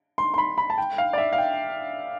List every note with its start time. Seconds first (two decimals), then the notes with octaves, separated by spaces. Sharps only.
0.18 C6
0.34 C6
0.38 B5
0.58 B5
0.70 A5
0.78 G5
0.98 F5
1.13 D5
1.18 E5
1.33 F5
1.38 G5